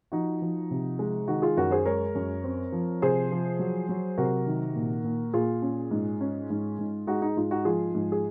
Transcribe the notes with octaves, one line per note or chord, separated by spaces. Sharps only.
F3 D#4 F#4
F3
C3
G#3
D#3 D#4 F#4
F4 G#4
F#2 F#4 A#4
G#4 C5
G#3 A#4 C#5
F#2
C4
F3
C3 G#4 C5
F3
F#3
F#3
C3 F#4 A#4
D#3
A#2
A#2
A#2 F4 G#4
C#4
G#2
C#4
G#2
G#2
G#3 D#4 F#4
D#4
G#2 F4
D#4 F#4
F3 F4 G#4
G#2
G#4